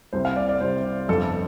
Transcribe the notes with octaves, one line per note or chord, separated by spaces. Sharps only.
C2 C3 G3 C5
F5
D5
D5
C2 C3 G3 C5
G1 F2 F3 A4